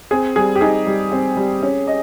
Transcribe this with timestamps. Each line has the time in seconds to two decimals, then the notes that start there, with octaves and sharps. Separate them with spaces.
0.11 C4 G#4
0.36 G3 G#4
0.56 G4
0.61 D#4 G#4
0.86 G3
1.12 C4
1.37 G3
1.62 C#4
1.87 D#5